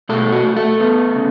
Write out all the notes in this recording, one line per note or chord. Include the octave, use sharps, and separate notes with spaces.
B2 A3 A4
F#4
A3
A3 A4
B3
C#3